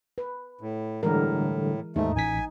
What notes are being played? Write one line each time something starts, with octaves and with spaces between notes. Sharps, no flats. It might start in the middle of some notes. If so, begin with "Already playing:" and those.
B4
A2
A2 D3 E3 G3 G#3 A#4
D#2 G#2 A3 D#4
A1 G#5 B6